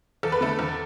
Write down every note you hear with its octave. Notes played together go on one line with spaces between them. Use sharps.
E2 A4
B4
D3 A3 A4
E2